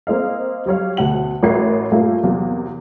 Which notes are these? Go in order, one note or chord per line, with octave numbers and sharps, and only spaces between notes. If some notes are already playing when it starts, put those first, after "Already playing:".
A#3 C4 D#5 F5
F#3 G3 C#5 F5
D2 B2 F#5 F#7
A1 F#4 A#4 E5 G#6 C7
G2 A#2 A3 A#3
E2 C3 F#3 A#3